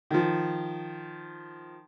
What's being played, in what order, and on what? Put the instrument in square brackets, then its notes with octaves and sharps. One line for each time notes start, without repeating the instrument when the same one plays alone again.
[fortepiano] D#3 F3